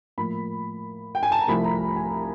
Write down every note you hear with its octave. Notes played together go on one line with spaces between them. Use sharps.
A2 F3 A#3 B5
G5
G#5
A5
A#5
C2 C3 F3 A3 B5
A#5
G#5